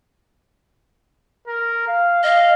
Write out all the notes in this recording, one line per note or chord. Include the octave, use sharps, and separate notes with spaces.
A#4
F5
D#5 F5